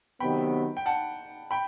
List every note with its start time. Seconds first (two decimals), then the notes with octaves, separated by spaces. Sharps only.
0.20 C3 D#3 F#3 B3 G5 B5
0.77 G5
0.86 F#5 A5
1.51 G5 B5